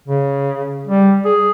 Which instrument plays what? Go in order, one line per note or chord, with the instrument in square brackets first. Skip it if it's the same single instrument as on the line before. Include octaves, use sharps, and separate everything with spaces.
[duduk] C#3
G3
G#4